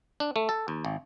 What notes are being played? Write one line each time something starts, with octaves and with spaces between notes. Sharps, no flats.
D4
A3
A4
D#2
G#1